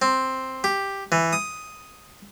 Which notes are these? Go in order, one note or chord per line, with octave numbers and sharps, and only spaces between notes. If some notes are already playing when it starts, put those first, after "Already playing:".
C4
G4
E3
D#6